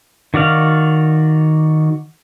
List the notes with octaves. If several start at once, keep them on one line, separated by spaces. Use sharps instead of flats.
D#3 F#4 D5 F5